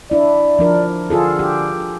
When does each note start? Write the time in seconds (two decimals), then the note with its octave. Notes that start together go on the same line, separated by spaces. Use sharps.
0.11 D4 E4 D5
0.59 F3 D4 A#4
1.10 D3 F4 G#4 A4
1.39 G4